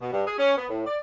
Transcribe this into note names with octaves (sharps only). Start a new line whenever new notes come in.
B2
G2
G#4
C#4
B3
A2
D5